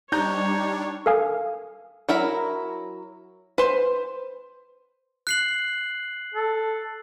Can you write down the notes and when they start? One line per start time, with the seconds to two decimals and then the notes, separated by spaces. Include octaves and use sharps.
0.12 G3 D4 D#4 C#5 A#5 G6
1.06 A4 A#4 F5 G#5 D#6
2.09 F#3 E4 A#4 B5
3.58 B4 C5
5.27 F#6 C7 F#7
6.34 A4